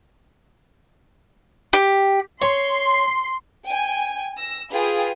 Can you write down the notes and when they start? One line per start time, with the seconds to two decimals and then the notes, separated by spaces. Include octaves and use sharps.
1.73 G4
2.42 C#5 C6
3.66 G5 G#5
4.37 E6 A#6
4.72 F4 G#4 B4 G5 D#6